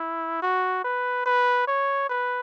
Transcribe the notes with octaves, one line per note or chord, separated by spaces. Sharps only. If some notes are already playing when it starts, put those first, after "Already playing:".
Already playing: E4
F#4
B4
B4
C#5
B4